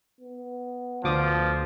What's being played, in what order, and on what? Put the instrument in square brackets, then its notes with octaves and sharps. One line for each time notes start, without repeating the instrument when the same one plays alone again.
[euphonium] B3
[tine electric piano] D2 D6 D#6 [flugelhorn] F3